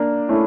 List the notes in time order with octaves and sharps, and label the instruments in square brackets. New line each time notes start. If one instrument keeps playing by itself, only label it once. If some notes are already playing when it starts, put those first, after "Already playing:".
Already playing: [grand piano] A#3 D4
[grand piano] A3 C#4 [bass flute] E4